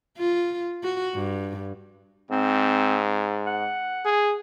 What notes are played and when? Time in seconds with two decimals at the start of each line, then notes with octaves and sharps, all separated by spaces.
0.19 F4
0.83 F#4
1.15 G2
2.31 G#2 C4
3.46 F#5
4.05 G#4